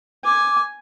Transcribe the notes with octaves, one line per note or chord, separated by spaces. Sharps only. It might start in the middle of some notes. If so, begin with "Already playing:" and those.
G#5 D6